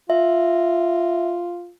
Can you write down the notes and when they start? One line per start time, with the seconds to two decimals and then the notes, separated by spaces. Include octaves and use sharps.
0.10 F4 E5